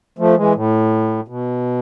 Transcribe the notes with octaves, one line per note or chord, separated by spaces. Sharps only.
F3 A3
E3 G#3
A2
B2